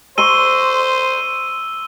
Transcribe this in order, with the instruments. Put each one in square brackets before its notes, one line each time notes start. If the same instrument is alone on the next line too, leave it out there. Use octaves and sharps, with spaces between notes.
[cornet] C5 [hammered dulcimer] A#5 C6 C#6 [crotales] E6 D#7 G7